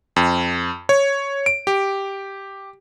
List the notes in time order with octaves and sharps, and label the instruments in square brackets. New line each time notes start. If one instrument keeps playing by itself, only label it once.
[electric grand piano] F2
C#5
D7
G4